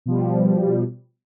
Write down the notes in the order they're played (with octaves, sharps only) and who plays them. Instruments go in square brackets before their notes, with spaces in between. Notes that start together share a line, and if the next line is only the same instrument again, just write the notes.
[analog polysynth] B2 F3 G3